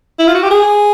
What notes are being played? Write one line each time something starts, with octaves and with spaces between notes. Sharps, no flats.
E4
F4
F#4
G4
G#4